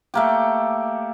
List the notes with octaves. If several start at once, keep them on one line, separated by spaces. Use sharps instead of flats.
A3 A#3 G4